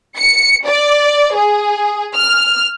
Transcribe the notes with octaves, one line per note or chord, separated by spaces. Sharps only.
C#7
D5
G#4
F6